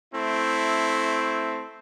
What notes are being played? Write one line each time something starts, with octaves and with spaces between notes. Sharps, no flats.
A3 C4 E4